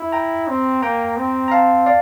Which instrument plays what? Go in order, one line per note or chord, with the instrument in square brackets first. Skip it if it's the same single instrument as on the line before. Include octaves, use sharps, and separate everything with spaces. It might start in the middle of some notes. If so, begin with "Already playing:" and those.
Already playing: [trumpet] E4
[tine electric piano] G5 A#5
[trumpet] C4
[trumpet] A#3 [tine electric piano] G5 A#5
[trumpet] C4
[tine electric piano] A#5
F5 A5
D5 F5